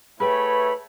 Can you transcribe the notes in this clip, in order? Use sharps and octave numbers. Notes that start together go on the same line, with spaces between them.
A3 E4 G#4 B4 C#5 G5 B5